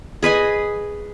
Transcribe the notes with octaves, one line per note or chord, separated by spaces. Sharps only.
G#4 B4 D#5 G#5